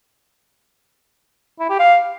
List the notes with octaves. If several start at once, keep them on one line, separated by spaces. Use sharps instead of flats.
E4
G4
F5